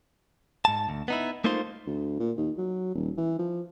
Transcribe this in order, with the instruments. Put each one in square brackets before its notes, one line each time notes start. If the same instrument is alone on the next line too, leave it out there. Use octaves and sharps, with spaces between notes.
[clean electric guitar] G#2 A5
D2
B3 D#4 E4
A3 A#3 D#4 F4 C5
[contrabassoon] D2
A#2
D#2
F#3
D#1
E3
F3